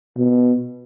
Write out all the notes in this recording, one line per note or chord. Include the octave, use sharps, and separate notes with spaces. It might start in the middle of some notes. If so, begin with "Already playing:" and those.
B2